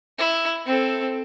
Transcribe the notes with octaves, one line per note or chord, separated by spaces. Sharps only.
E4
C4 A4